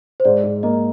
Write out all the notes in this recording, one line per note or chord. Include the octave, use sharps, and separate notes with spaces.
C5
G#2 D5
G#2
A#3 D#5